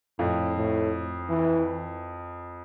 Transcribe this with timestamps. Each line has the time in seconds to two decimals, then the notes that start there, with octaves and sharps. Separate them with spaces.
0.19 F2 A2
0.56 A2
1.29 E3